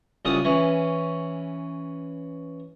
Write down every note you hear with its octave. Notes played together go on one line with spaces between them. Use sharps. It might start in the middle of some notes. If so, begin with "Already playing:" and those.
C2 C#3 F4 F#5 D#6
E3 C#4